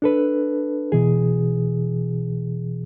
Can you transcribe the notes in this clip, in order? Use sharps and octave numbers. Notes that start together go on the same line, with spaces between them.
D4 A4 B4
B2 E3 G#4